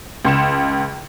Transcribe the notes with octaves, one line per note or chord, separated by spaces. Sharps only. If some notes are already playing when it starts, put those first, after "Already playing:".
C#2 C6 C#7 E7